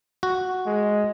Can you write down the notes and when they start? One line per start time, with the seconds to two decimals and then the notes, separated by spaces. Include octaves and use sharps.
0.23 F#4
0.66 G#3